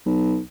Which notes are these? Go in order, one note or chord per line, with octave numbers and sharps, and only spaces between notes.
B1